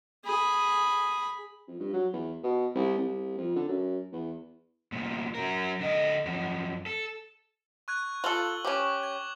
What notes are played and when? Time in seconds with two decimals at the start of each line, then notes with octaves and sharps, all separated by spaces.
0.25 G#4 B5
1.68 F2
1.79 G2
1.93 F#3
2.13 E2
2.43 B2
2.75 C2
2.98 C2
3.37 F2
3.56 D3
3.68 F#2
4.12 E2
4.92 C2 A#2
5.35 F#3 A#4
5.80 D3 D#5
6.25 F#2 F3
6.86 A4
7.88 C#6 F#6 G#6
8.24 F4 A4 F#7 G7
8.65 C#4 G4 C#6 D6
9.03 G#6